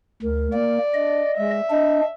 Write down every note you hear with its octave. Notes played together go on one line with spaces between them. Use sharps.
D2 A#4
A#3 D5
D4 D#5
G#3 E5
D4 D#5